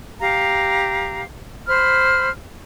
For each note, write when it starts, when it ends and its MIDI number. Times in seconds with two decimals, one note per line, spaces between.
0.21 1.22 67
0.21 1.22 77
0.21 1.22 82
1.67 2.29 72
1.67 2.29 83
1.67 2.29 89